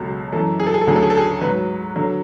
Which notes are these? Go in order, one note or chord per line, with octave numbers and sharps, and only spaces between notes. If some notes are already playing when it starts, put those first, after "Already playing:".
Already playing: C#2 B2 F#3 A4
F#2 E3 A4
G#4
A4
G#4
A4
D2 D3 F#3 G#4
A4
G#4
A4
G#4
G#2 F#3 B4
D3 F#3